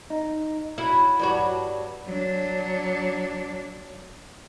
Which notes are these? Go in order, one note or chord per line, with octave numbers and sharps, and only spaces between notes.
D#4
F#3 E4
G2 F#3 F#4
F#3 D4